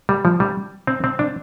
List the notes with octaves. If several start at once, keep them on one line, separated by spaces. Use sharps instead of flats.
G3
F3
G3
C4
C4
D4